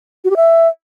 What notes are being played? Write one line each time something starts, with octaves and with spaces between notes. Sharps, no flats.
F#4
G4
E5